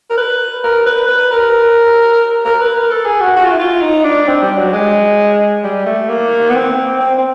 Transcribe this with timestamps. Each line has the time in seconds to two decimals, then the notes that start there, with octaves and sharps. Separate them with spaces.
0.10 A#4
0.17 B4
0.64 A#4
0.86 B4
1.08 B4
1.32 A#4
2.45 A#4
2.61 B4
2.75 A#4
2.91 A4
3.06 G#4
3.21 F#4
3.36 F#4
3.45 F4
3.52 E4
3.59 F4
3.82 D#4
4.04 D4
4.28 C4
4.42 G3
4.58 F#3
4.73 G#3
5.64 G3
5.86 A3
6.09 A#3
6.50 B3
6.55 C4
7.01 C4
7.18 C4